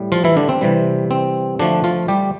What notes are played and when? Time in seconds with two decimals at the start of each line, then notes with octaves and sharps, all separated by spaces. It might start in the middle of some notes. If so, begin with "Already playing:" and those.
Already playing: A2 G3
0.12 F3 F4
0.24 E3 E4
0.37 D3 D4
0.49 C4
0.61 C3 E3 G3
1.11 C4
1.59 D3 F3 A3 D4
1.84 F3 F4
2.08 G3 G4